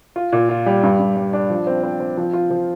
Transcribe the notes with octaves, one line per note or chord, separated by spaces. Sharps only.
F4
A#2
F4
G3
G2
G2
G3
D4
F3
C4
C4
C4
F3
F4
F3